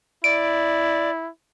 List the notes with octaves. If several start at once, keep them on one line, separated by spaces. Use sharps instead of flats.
E4 D5 D7